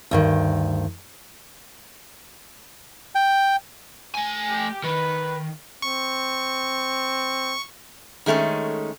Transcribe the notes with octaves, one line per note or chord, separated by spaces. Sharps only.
D2 G2 D#3
G5
A3 G#5
G4
D#3 B4
C4 C#6
D#3 G#3 A3 C4 C#4